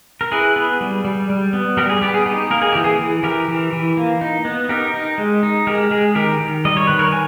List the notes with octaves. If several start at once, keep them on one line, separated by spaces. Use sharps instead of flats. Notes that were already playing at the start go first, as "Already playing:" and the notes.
A#4
E4 G#4 B4
B3
G3
G3
G3
B3
G3 G4 A#4
G#4
B3 G4
G#4
D#4 G4
A#3 A#4
G#4
E3 G4
G#4
E3
E3 G4 A#4
E3
E3
A#3
D#4
B3
D#4 G4 A#4
D#4
G#3
D#4
G#3 G4 A#4
G#3 G#4
D#3 G4 A#4
D#3
G3 D#5
C#5
D#3 B4
A#4 C#5
G#5